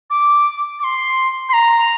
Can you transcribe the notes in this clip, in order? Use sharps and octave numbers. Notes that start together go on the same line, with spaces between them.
D6
D6
C6
C6
A#5